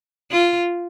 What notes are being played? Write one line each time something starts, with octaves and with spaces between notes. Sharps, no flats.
F4